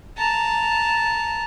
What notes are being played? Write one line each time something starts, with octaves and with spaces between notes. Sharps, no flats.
A5 A#5